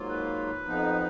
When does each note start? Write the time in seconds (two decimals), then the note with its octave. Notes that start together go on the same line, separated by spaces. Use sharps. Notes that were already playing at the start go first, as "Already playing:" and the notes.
Already playing: G#2 F#3 A#3 F4
0.09 B4
0.65 F2 F3 B3 D#4